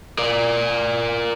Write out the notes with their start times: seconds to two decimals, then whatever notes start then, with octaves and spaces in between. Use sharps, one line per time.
0.18 A#4 D5